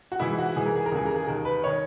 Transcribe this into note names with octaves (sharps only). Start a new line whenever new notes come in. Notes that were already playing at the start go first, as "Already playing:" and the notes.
F#4
G#2 E3 E4
F#4
G#2 E3 G#4
A#4
G#4
A#4
D#2 C#3 E3 G#4
A#4
G#4
D#2 D#3 A#4
B4
D#3 C#5